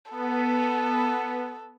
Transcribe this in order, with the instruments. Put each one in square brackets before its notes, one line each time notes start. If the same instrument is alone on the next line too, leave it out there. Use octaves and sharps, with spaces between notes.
[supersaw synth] B3 [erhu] A4